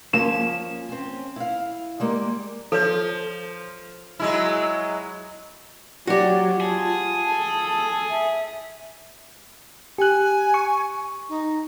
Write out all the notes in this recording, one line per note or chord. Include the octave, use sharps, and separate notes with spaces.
F3 A#3 C#4 E7
C4 C#4
E4 F5
G3 G#3 A#3
F3 A4 B4 C#5
F#3 G#3 E4
F#3 F#4 G4 D5
F4 G#4 A5
A4
E5
G4 G#5 F#6
C#6
D#4